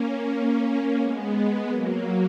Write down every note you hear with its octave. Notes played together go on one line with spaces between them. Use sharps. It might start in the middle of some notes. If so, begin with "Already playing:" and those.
Already playing: A#3 C#4
G#3 B3
F#3 A#3